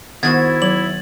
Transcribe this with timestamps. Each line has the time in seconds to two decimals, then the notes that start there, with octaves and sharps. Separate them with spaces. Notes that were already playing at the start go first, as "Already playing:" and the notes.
0.23 D#3 B3 E4 F#4 C5 G#6 A6
0.62 F#3 F#7